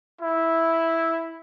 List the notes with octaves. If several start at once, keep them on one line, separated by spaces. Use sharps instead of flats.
E4